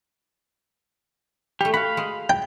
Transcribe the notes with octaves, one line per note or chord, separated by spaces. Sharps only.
G3 A3 G4
F#4 F5 B5
G#3
G5